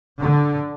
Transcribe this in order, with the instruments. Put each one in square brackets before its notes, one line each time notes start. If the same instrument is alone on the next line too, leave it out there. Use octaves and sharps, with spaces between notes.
[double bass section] D3